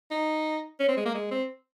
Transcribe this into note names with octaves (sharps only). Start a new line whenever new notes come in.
D#4
C#4
C4
G#3
A#3
G#3
C4